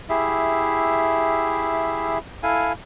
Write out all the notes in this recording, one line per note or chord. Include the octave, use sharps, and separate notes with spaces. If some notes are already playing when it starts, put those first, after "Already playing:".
E4 G4 G#4 E5
E4 A4 F5 G#5